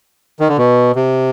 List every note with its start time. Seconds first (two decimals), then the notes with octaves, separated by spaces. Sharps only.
0.40 D#3
0.49 D3
0.58 B2
0.96 C3